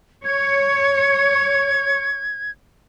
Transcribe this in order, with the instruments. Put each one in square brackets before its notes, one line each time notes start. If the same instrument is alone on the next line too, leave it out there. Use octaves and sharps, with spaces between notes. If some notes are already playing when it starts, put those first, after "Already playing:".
[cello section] C#5 [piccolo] G#6